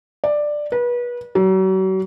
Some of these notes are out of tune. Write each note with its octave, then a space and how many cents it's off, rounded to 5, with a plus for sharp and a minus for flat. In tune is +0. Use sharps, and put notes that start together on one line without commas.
D5 +10
B4 -30
F#3 +40